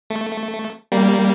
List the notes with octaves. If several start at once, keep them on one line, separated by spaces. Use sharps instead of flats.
A3
G3 A#3